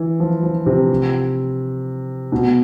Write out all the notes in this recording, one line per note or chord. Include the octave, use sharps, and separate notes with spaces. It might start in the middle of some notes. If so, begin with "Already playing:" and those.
Already playing: E3
F3
F3
C3
B2